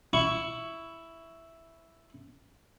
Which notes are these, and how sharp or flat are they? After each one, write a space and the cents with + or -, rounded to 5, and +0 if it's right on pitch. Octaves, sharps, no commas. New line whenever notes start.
E4 +0 C#6 +10